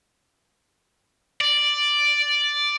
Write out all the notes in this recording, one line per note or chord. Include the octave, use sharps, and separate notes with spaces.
D5